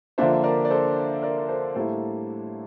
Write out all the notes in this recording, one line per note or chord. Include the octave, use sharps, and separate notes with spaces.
D3 F3 A#3 D4 C5 E5
A#4 D5
D5
A4 C5
A#4 D5
A#4
A4 C5
A2 G3 A#3 E4 A4 C5